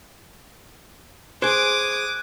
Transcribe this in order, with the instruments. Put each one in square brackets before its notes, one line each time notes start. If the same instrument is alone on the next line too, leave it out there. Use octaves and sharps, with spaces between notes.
[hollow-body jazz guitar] G#4 C5 [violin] D6 D#6 [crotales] F#6 G#6 D7